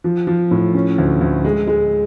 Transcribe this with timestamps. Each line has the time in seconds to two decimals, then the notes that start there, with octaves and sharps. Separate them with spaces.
0.04 F3
0.27 F3
0.51 A2
0.74 C#4
0.98 D2
1.21 D2
1.45 G#3
1.67 G#3